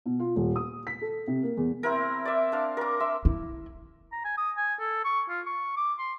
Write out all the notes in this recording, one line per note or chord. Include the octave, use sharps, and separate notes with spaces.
B2
F4
D#1
D#6
B6
A4
C3
A#3
E2
C4 E4 A#4
D5 E5
D4 F5
A#4 D6
E5 C6
E4
A#5
G#5
D#6
G#5
A4
C#6
F4
C#6
D6
C6